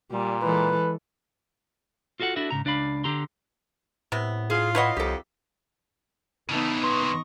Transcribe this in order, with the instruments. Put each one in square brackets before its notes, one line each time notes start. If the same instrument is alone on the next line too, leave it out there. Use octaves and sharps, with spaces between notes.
[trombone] A#2 [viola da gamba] G3
[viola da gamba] E3 G#3 A4 [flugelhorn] B4
[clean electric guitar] F4 F#4 A4 E5 F#5
D4 E4 F#4 A4 E5
G#2 C#3 A#5
C#2 D4 D5 F5 B5
D3 G4 A#5 C6
[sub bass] A2 [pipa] C3 B3
[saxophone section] F4 [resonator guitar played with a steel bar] G#4
[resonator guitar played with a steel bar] E4 F#5 [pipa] B4 C#5 D#5
[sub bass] C2 [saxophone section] F2 D#3 F3 [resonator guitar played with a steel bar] G4 A4
[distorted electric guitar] C#3 E3 [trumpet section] A3 A5 [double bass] B3 D#4
[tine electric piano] B4 C6 [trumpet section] D#5 A#5 C#6